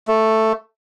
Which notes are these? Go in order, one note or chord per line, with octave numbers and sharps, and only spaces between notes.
A3